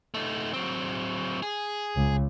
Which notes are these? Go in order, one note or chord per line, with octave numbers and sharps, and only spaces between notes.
A3 D#4
F#3 C4
G#4
C#2